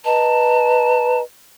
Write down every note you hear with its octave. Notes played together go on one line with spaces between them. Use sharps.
B4 D#5 A5 A#5